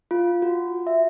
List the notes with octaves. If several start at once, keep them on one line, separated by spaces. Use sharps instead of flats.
F4
F#4
E5